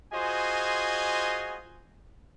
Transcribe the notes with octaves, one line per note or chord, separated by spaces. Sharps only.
F4 F#4 G#4 C5 D#5 G#5